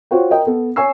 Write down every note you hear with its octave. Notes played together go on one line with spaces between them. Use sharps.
F4 F#4 C5 C#5 G5
A#4 D#5 G5
B3 A4
C#5 G#5 C#6 E6 C7